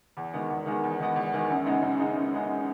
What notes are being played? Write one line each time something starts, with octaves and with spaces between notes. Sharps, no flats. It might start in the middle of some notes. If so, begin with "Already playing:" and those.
E2
D#3 G#3 B3
E2
D#3 G#3 B3
E2
D#3 G#3 B3
E2
D#3 G#3 B3
F#2
C#3 G#3 B3 D#4
F#2
C#3 G#3 B3 D#4
F#2
C#3 G#3 B3 D#4